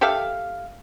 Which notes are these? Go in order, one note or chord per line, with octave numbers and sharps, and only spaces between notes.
G4 A4 E5 F5